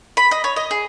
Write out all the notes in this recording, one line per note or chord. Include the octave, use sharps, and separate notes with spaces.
B5
D#5
C#5
D#5
G#4